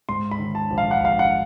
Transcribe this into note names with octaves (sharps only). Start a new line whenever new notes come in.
G#2 C6
B5
D#3
A5
A#1
F5
F#5
A#1 F5
F#5